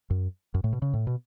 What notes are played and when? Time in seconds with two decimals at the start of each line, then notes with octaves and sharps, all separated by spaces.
0.10 F#2
0.54 F#2
0.64 A2
0.73 B2
0.82 C#3
0.94 A2
1.07 B2